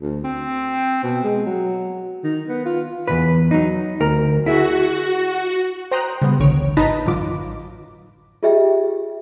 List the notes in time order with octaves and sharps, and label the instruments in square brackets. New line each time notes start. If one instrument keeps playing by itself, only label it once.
[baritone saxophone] D2
C4
B2
G#3
F#3
D#3
B3
F4
[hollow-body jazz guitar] E2 G#2 B4
F#3 D#4
D2 A#4
[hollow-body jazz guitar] E4 G#4 E5 [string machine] F#4
[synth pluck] C5 G5 A#5 C6 D#6 F#6
C#3 G3 B3
A1 D2 D3 C#5 D7
G#1 D#4 B4 A5 A#6 B6
A1 F#2 D3 F#3 F4 D6
[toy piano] F4 G4 G#4 D#5 E5 G5